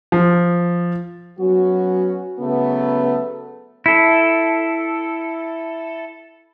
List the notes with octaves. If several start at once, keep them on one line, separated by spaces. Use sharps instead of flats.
F3
F#3 B3 C#4 F#4
C#3 F#3 A3 B3
E4 A4